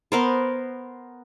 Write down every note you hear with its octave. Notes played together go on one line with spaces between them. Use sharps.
B3 A#4 C5